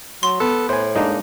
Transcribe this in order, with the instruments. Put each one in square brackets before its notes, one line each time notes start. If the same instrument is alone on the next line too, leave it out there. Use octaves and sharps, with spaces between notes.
[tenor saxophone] F#3 [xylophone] C6
[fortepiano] B3 [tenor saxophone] A4
[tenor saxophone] A2 [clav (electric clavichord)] C5 G#5
[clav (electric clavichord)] G#3 A#3 D4 [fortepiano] D#4